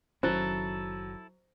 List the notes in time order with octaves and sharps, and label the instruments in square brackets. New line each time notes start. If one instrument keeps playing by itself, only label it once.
[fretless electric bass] F#1 D#3 C#4 [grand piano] F#3 [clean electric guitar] E4 A4 [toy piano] C5